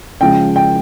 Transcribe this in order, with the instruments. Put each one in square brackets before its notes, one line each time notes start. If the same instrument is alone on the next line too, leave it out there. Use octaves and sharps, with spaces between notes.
[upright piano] C#3 F3 G#3 G5
G5